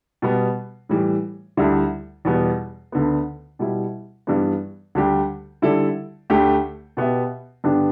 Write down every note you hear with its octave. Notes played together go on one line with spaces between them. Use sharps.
B2 G3 B3
A2 E3 G3
D2 D3 G3 E4
E2 B2 G3 B3
D2 D3 B3
B2 G3 E4
G2 E3 G3 B3 D4
D2 D3 G3 D4 G4
D3 G3 E4 A4 D5
D2 D3 A3 G4
B2 B3 G4 E5
G2 D3 B3 D4 G4